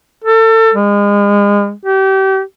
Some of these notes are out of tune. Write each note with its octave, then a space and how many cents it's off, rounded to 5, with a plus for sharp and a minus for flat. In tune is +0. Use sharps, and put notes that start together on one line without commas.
A4 +30
G#3 -35
G4 -30